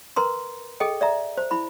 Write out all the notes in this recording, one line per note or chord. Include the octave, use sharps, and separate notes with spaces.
A#4 B4 A#5 C6
G#4 A4 D#5 G5
D5 E5 A#5
C5
E4 B5